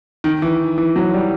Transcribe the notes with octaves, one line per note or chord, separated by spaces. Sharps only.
D#3
E3
E3
F#3
G3